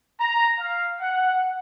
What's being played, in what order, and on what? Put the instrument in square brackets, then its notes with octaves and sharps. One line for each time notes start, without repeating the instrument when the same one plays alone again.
[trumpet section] A#5
F5
F#5